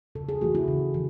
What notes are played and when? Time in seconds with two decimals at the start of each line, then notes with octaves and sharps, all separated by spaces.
0.15 C#3 A4
0.29 G#4
0.41 E3 A3 F#4
0.55 E4
0.68 C#3
0.94 E3